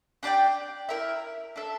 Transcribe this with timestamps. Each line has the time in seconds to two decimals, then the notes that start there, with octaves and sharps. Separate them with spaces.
0.23 D4 G4 D5 G5
0.89 E4 A#4 E5
1.56 D4 A4 E5